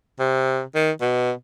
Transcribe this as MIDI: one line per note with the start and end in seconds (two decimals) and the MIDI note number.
0.19 0.62 48
0.75 0.91 51
1.01 1.32 47